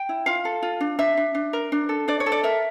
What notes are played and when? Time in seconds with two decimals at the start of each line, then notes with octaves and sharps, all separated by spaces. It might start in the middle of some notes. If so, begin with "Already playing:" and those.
Already playing: G5
0.09 E4
0.26 F4 F5
0.45 A4
0.62 F4
0.80 D4
0.99 D4 E5
1.17 D4
1.35 D4
1.53 A#4
1.72 D4
1.89 A4
2.08 D4 D5
2.20 C#5
2.26 A4
2.32 D5
2.43 A#4 E5